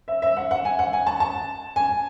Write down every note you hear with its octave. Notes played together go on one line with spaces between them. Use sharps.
E5
E5
F#5
F#5
G#5
F#5
G#5
A5
A5
G#5